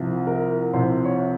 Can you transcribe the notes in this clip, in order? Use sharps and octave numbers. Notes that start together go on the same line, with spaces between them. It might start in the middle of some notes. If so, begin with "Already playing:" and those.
Already playing: C2 C3 F3
A#4
C2 C3 F3 C5
C#5